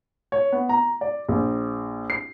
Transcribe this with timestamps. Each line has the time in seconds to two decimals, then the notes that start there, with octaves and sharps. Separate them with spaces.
0.32 C#5
0.52 B3
0.69 A#5
1.01 D5
1.29 A#1
2.10 C7